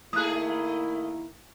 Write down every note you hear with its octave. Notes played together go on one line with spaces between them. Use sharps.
D#3 A3 A#3 E4 G#4 D#6 F#6